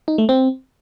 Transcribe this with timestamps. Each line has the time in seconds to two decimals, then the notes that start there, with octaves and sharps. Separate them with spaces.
0.08 D#4
0.18 A3
0.29 C4